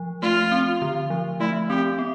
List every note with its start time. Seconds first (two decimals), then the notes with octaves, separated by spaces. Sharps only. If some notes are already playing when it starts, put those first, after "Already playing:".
Already playing: F3
0.22 A3 F4
0.52 C4
0.82 D3
1.10 F3
1.40 A3 E4
1.70 C4 G4
1.99 B3